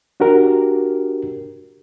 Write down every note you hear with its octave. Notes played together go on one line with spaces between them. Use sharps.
D4 F#4 G4 A#4